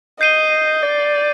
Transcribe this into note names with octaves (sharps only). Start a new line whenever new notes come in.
D#5 G6 C7 D#7 G7
D5